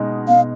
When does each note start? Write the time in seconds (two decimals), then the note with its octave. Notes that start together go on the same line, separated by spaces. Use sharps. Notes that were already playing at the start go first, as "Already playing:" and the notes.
Already playing: B2 G#3 D#4
0.28 B2 F5